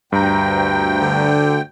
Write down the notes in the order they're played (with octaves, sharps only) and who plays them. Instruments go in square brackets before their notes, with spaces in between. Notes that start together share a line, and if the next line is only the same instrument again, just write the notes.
[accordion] D2 G5 [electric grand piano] G2 A#5
[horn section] D3